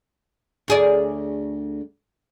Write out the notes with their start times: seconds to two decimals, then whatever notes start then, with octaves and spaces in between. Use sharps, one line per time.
0.68 D2 G#4 D5